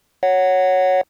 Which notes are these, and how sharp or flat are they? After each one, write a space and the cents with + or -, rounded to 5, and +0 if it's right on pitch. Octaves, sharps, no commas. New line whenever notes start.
C#5 +0 F#5 +0